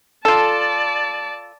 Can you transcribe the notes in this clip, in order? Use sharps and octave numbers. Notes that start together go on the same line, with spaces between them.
F4 A4 D5 A5